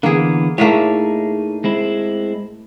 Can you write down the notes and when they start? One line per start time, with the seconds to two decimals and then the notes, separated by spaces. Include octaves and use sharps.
0.03 D3 E3 A#3 B3 G#4
0.58 A2 A3 A#3 D#4 G#4 C#5
1.64 G#3 C4 E4